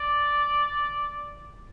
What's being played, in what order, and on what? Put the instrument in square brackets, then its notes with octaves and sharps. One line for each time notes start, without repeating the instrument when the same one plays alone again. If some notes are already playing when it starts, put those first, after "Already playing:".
Already playing: [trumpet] D5